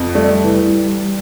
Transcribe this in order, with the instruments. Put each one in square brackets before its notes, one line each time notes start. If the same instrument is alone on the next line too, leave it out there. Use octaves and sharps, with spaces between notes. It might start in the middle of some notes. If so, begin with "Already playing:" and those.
Already playing: [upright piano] F2
[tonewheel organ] G3 [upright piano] A3
[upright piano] E3